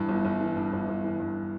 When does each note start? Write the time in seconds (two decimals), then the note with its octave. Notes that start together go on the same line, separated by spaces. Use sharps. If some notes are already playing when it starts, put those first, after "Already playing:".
Already playing: G2 E3
0.09 G1
0.25 G1
0.41 E3
0.57 G2
0.73 G1
0.88 G1
1.04 E3
1.20 G2